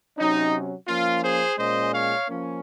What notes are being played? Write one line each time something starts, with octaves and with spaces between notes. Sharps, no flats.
C3 F#3 C#4 D#4
F3 A#3 C#4 F4
G#4 C5
A#2 G#3 C#4 C5 D#5
C#5 F5
F3 A#3 C#4